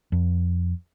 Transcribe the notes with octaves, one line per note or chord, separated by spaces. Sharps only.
F2